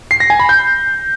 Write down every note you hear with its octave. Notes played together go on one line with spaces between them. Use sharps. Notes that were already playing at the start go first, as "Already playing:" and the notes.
C7
A#6
G#5
B5
G6